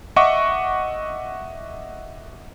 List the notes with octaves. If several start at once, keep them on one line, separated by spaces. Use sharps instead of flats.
D#5 E5 F#5 C#6 D6